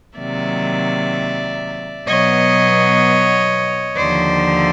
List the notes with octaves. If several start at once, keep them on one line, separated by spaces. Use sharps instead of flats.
C3 D#3 F#3 A#3 D5 E5
B2 F#3 B3 C#5 D#5
D#2 D3 F3 C5 D5